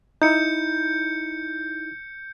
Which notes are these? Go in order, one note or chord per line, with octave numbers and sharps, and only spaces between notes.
D#4 E4 G6 C#7